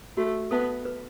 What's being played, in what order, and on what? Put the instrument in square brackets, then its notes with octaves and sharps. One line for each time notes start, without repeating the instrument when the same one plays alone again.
[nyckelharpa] A3 [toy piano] F#4
[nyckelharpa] B3 [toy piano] A4 E5 A5
[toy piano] B4